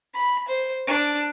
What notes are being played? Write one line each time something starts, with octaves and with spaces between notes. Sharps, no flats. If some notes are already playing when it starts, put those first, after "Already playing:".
B5
C5
D4